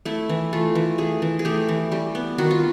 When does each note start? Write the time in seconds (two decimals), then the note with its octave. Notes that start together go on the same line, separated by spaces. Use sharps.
0.05 A3 E4
0.29 E3
0.53 A3 F4
0.75 E3
0.98 A3 G#4
1.22 E3
1.39 G#4
1.45 A3 G4
1.68 E3
1.92 G3 G4
2.15 B3
2.38 D#3 F#4
2.51 F4